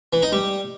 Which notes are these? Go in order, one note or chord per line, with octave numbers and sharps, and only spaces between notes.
E3
D#4
G3